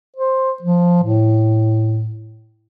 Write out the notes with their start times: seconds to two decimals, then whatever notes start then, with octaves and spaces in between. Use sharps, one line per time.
0.17 C5
0.63 F3
1.03 A2